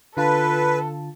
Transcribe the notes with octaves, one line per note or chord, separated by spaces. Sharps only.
D3 F4 A4 B4 A5